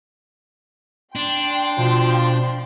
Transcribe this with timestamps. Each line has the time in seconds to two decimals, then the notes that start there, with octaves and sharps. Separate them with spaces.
1.16 D4 G5 C6
1.78 B2 F3